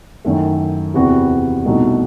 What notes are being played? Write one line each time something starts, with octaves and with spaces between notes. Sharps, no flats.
F#2 D#3 A3 E4
E2 C3 E3 B3 F#4
C2 B2 A3 D#4 F#4